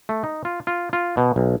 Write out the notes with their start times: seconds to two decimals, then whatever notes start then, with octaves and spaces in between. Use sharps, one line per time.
0.09 A3
0.24 D#4
0.45 F4
0.67 F4
0.93 F4
1.17 B2
1.36 B1